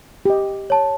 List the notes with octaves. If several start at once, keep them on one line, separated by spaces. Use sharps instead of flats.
G4 D#5
C#5 A5